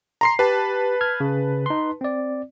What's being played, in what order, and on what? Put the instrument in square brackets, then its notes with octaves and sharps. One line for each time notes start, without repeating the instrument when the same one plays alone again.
[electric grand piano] A#5 C6 C7
[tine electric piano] G4 [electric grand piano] B4 A5
[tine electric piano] F6 G#6
C#3
D#4 C6
C4 D5